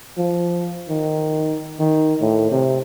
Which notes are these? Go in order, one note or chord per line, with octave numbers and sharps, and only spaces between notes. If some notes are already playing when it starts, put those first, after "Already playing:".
F3
D#3
D#3
A2
C3